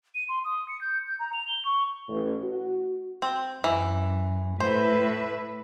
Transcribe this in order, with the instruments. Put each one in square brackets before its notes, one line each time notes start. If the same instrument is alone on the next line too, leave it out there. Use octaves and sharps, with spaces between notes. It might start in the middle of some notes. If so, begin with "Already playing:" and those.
[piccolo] D#7
C6
D#6
C#7
G6
G6
A#5
F7
G7
C#6
[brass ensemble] A1
F#4
[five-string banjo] C4
[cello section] F#2 [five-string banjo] E3
[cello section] A2 B4 E5 [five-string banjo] C5